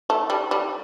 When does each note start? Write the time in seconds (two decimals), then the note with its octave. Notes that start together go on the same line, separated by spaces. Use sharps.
0.10 A3
0.30 G3
0.51 G3